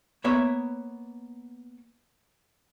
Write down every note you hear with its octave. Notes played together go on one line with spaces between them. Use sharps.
A#3 B3 C#5 E5